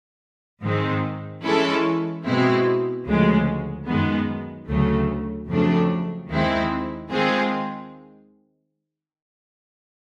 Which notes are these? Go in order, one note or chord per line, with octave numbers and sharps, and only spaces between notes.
G#2 D#3 G#3 C4
E3 G#3 C#4 E4 A4
B2 G#3 C4 E4
D2 C#3 F3 G#3
F#2 D#3 G#3 B3
D2 C#3 F#3 A3
F2 C#3 F#3 A3 D4
D#2 D#3 G#3 C4 E4
D#3 G#3 C4 F4 G#4